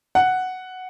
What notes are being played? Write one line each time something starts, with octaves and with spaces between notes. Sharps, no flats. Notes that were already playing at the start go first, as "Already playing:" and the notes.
F#5